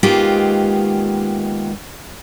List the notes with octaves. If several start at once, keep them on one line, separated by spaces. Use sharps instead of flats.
D#3 G#3 A#3 B3 F4 G4